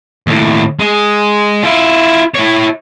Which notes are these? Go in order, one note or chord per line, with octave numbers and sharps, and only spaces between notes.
D#2 A2
G#3
E4 F4
E4 C#5